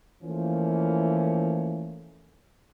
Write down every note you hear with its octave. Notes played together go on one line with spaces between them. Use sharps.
E3 F3 A3 A#3 C#4